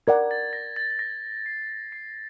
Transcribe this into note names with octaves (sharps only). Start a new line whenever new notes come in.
A#4 D5 F#5 G#6
A6
A#6
A6
A6
A#6
C7
C7